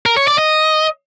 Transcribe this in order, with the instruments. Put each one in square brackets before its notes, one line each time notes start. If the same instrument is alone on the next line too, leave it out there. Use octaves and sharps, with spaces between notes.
[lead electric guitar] A#4
C#5
D5
D#5